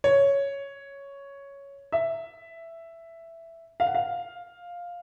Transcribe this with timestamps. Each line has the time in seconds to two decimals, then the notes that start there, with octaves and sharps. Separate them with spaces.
0.04 C#5
1.92 E5
3.80 F5
3.87 F#5
3.94 F5